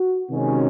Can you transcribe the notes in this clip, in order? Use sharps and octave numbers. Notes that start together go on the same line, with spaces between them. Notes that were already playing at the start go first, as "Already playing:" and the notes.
Already playing: F#4
C3 D#3 G#3 C#4